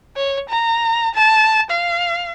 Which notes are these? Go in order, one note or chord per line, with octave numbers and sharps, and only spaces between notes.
C#5
A#5
A5
F5